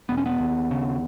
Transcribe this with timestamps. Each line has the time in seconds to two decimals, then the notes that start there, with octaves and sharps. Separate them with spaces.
0.09 E1 B3
0.17 C#4
0.26 B3
0.40 D#2
0.71 C#3